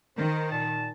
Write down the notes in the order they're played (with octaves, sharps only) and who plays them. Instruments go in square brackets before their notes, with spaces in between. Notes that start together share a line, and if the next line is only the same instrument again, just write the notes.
[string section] D#3 [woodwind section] A#4 C5
[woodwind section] A#2 A5